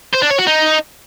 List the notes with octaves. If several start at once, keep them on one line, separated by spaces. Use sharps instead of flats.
C5
D4
C#5
F#4
D#4